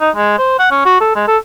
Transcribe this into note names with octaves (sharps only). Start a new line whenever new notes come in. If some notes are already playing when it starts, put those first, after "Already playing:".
D#4
G#3
C5
F#5
C#4
F#4
A4
G#3
A4